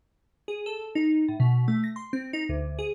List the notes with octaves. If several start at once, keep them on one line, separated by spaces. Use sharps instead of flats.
G#4
A4
D#4
A2
B2
A3
A#6
C6
C4
D#4
D2
G#4